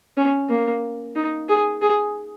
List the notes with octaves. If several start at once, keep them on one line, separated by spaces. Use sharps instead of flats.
C#4
A#3
D#4
G#4
G#4